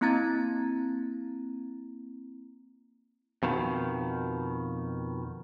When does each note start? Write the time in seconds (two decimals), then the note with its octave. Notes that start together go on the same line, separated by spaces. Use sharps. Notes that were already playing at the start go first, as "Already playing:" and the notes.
0.01 A#3 C4 E4 A#5 G#6 A6
3.43 F2 B2 D#3